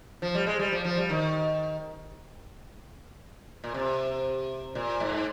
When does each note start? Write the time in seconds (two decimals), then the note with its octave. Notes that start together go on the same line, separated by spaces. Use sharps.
0.22 F3
0.35 G3
0.47 G#3
0.59 G3
0.72 F3
0.85 F3
0.98 G3
1.10 D#3
3.64 A#2
3.74 C3
4.75 A#2
5.00 G#2